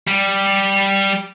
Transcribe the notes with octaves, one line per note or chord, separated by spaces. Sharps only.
G3